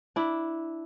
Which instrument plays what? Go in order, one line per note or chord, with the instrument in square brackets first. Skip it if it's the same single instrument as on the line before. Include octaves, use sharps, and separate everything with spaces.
[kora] D4 E4